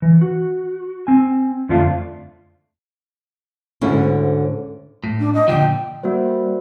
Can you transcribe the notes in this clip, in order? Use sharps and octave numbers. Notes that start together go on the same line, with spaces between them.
E3
F#4
C4 G#5
F2 D3 F3 A3 D4 F4
D2 G#2 D3 C#4 E4
A2
D4
D#5
A#2 D3 F3 G5
G3 A#3 F#4 C5